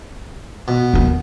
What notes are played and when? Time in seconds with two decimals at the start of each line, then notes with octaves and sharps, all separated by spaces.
0.68 B2
0.94 D#2 B3